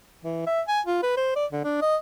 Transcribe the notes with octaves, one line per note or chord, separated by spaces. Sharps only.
E3
E5
G#5
F4
B4
C5
D5
D3
D4
D#5